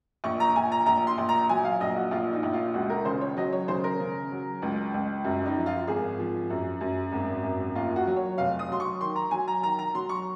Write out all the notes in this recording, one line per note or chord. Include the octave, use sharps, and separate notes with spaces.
A#1 C#6
A#5
A#1 G#5
A#5
A#1 A#5
C6
A#1
A#5
F#3 G#5
F5
A#1 D#5
F#4
A#1 F4
D#4
A#1
F4
C#2 F#4
A#4
C#3 C5
C#5
F#3 D#5
C#5
C#3 C5
A#4
C#3
F#3
C#2
C#2
F#2
D#4
F3
F4
G#1 G#4
F3
F#2
F#2
G#1
F#2
D#2 F4
F#4
F#3
C#5
F1 F5
D#6
F#3 C6
C#6
D#3 C6
A#5
F#3 G#5
A#5
D#3 A#5
A#5
F#3 C6
C#6